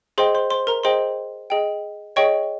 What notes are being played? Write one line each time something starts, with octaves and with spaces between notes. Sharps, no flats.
G#4 C5 D#5 G5 C6
C5 C6
C5 C6
A#4 A#5
G#4 C5 D#5 G5 C6
G#4 D#5 G5
G#4 C#5 D#5 G5 C#6